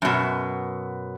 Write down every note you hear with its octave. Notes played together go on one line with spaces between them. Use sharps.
F#2 B2